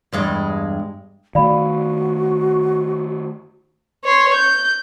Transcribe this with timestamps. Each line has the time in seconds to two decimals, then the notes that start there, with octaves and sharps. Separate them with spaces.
0.12 E2 G2 G#3
1.35 D#3 A3 F#4 D5 F5 B5
4.04 C#5 C6
4.34 G6